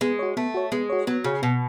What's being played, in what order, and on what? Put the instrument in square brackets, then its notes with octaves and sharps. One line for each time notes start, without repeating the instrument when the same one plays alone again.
[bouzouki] G#3 [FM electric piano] B3
[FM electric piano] F#4 C#5
[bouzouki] A3 [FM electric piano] B3
[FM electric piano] F#4 C#5
[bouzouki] G#3 [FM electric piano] B3
[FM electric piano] F#4 C#5
[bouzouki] F#3 [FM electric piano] B3
[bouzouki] C#3 [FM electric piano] F#4 C#5
[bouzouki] B2 [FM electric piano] B3